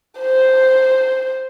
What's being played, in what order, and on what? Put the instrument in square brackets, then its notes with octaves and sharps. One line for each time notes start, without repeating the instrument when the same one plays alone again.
[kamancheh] C5